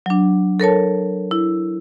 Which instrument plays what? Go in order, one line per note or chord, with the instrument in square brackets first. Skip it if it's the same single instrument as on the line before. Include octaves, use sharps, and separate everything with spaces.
[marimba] F#3 D4
A4 A#4 C#5 A5
E4